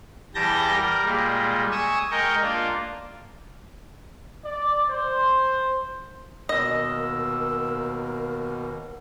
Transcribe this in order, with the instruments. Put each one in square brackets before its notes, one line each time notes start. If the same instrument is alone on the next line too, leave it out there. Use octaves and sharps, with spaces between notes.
[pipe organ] E2 G3 G4 A5 G6 A#6
G3 A#4
A#2 G3 G#3
G#5 C#6 D#6 E6
G#3 A#4 D#5 G5 C#6
A#3 D4 F4
[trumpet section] D5
C5
[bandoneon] D#2 B2 [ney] A#4 [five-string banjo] D#5 [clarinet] E6